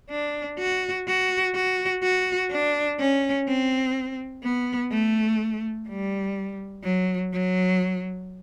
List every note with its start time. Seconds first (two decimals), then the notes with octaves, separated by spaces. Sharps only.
0.10 D4
0.59 F#4
1.07 F#4
1.55 F#4
2.03 F#4
2.51 D4
2.99 C#4
3.47 C4
4.43 B3
4.91 A3
5.88 G3
6.84 F#3
7.33 F#3